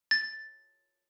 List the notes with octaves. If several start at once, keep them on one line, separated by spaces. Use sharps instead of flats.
A6